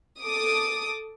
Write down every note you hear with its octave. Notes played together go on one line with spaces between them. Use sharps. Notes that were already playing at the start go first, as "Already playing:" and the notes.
A4 D6 D#6